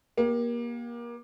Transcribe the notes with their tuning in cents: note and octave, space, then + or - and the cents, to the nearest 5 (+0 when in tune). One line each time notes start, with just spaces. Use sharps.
A#3 +30 G4 +0